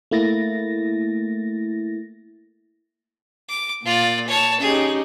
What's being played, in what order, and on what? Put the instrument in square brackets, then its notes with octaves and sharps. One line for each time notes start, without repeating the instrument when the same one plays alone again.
[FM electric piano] A3 A#3 E4 A6 A#6
[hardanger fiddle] D6
[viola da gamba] A#2 [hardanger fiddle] F4 D5
[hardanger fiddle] C#5 A5
[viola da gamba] C#4 D#4 G4 [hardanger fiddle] G#4